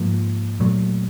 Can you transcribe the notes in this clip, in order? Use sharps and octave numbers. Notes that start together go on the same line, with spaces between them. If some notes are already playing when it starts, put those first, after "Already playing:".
Already playing: G#2 F3 A#3
A#2 F#3 A3